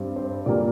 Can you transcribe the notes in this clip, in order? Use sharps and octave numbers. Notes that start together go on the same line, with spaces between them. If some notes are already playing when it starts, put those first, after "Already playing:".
Already playing: G2 G3 C4
C5
A#2 G3 A#3 D5